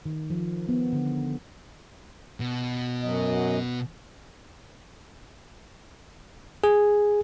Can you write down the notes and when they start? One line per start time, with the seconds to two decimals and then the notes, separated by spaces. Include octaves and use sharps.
0.06 D#3
0.30 F3
0.68 B3
0.93 D3
2.40 B2
3.03 F#2 F#3 D#5
6.64 G#4